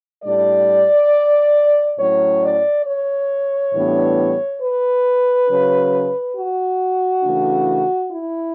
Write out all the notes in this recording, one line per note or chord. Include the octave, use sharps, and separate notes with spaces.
A2 G3 D4 D5
A2 F#3 C#4 C#5
D5
C#5
A2 E3 G3 B3 D4
B4
C#3 F#3 C#4
F#4
C#3 E3 A3 D4
E4